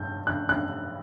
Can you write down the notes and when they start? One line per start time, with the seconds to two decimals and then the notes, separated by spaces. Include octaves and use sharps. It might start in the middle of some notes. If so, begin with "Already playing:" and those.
Already playing: G2 G6
0.27 F#6
0.49 F#6